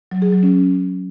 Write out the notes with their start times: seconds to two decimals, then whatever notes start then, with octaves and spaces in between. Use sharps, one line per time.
0.11 F#3
0.22 G#4
0.32 F#3
0.43 C#4